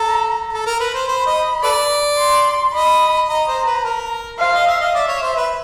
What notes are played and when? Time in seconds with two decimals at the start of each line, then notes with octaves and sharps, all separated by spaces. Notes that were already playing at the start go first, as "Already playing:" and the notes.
Already playing: A4 A#5
0.53 A4
0.66 A#4
0.80 B4
0.94 C5
1.08 C5 B5
1.27 D#5
1.63 A4 B4 D5
2.19 C6
2.73 D#5 B5
3.29 D#5 A#5
3.48 C5
3.66 B4
3.84 A#4
4.39 C5 F5
4.54 D#5
4.67 E5
4.81 D#5
4.95 D5 E5
5.08 C#5
5.22 C5
5.36 B4